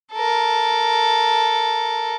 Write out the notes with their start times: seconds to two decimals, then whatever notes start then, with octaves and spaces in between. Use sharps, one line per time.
0.13 A4 A#4